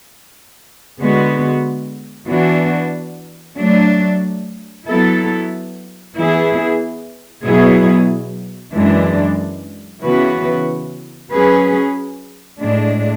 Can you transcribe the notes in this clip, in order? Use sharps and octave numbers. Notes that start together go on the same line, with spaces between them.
D3 G#3 B3 F#4
E3 B3 D4 F#4
F#3 A3 D4
F#3 B3 E4 A4
E3 B3 E4 G#4
B2 F#3 B3 E4 G#4
F#2 E3 G#3 D4
C#3 E3 B3 F#4 B4
F#3 C#4 G#4 B4
A2 G#3 D4